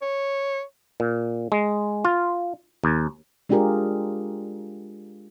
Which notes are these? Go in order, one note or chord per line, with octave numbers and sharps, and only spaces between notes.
C#5
A#2
G#3
F4
D#2
G#3 D4 F4 G4 G#4 A#4